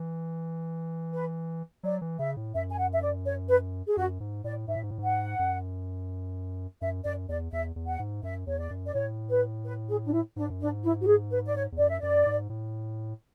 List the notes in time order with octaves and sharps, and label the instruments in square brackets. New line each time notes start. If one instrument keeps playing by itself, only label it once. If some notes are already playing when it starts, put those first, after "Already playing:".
Already playing: [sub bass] E3
[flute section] B4
[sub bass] F#3 [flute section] D5
[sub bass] E3
[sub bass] C#3 [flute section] E5
[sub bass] A2
[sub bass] F#2 [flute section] E5
[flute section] G#5
F#5
E5
D5
C#5
B4
G#4
[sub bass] F#2 [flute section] F#4
[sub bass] G#2
[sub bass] A2 [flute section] D5
[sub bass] G#2 [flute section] E5
[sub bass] A2
G#2
A2
G#2
[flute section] F#5
[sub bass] F#2
[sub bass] F#2 [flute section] E5
[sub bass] F#2 [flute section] D5
[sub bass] E2 [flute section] D5
[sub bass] E2 [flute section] E5
[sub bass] E2
[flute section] F#5
[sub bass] G#2
[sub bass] F#2 [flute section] E5
[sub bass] E2 [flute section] C#5
[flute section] D5
[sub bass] F#2
[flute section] D5
[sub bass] A2 [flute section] C#5
[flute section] B4
B4
G#4
D4
E4
[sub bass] G#2 [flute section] D4
[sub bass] F#2
[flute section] D4
[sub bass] G#2
[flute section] E4
F#4
G#4
B4
D5
C#5
[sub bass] E2
[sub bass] F#2 [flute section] D5
[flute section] E5
[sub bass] F#2 [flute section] D5
[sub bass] G#2
A2